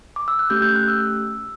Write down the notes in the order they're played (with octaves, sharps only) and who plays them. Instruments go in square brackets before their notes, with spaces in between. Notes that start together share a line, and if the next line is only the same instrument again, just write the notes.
[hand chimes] D6
E6
F#6
A3 C#4 G4 G6
G6
F#6
E6